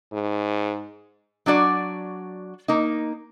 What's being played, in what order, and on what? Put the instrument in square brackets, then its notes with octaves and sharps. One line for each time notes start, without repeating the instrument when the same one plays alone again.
[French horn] G#2
[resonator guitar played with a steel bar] F#3 D4 F#4 D5
A#3 D#4